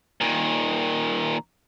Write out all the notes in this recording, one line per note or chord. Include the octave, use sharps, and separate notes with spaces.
A#2 D#3